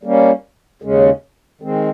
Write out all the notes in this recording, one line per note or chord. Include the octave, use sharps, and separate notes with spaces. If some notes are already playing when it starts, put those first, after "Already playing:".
G3 A#3 C#4
D#2 C#3 G#3 C#4
D#3 G#3 C4